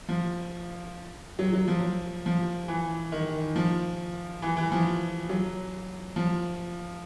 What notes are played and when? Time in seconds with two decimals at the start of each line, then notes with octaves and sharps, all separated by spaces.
0.09 F3
1.39 F#3
1.53 F#3
1.68 F3
2.26 F3
2.68 E3
3.12 D#3
3.56 F3
4.42 E3
4.57 E3
4.72 F3
5.29 F#3
6.16 F3